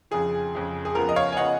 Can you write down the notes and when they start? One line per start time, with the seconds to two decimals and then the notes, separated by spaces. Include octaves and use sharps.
0.11 F2 C#3 F3 G#4
0.54 F2 C#3 F3
0.85 G#4
0.95 C#3 F3 B3 A#4
1.09 D#5
1.16 C#5 F5
1.32 G#5
1.37 C#3 F3 B3 D#5 F#5